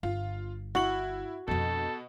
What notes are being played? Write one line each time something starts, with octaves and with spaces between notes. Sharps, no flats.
G1 F4
E4 F#4 F#7
F2 B2 D4 A4